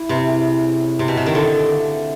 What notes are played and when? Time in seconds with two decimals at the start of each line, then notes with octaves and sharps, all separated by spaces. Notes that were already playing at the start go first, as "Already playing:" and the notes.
Already playing: E4
0.09 C3 B4
0.27 G#4
0.45 E5
0.63 C#4
0.81 C#4
0.99 C3 B4
1.08 B2
1.17 C3 C#4
1.26 D#3
1.35 D3 F4
1.52 A3
1.71 A3
1.89 C4